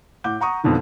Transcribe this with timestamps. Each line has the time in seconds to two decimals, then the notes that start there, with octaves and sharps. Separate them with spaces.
0.24 A2 F#5 D6 G6
0.41 F#5 A#5 C#6 D#6
0.64 F2 G#2 B2 D3 D#3